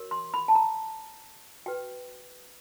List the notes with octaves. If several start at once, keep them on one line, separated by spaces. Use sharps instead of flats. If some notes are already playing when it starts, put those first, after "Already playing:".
Already playing: F#4 A#4 C#5
C6
B5
A5
A#5
F#4 B4 G5